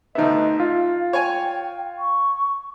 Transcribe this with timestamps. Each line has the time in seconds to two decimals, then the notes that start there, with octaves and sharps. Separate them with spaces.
0.15 D2 B3 D#4 D#5 E5
0.60 F4 F5
1.13 C#5 G5 G#5
1.98 C#6